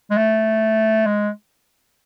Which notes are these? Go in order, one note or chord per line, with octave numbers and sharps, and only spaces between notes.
G#3
A3
G#3